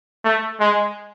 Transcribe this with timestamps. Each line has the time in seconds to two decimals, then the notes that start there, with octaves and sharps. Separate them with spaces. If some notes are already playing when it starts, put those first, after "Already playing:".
0.24 A3
0.60 G#3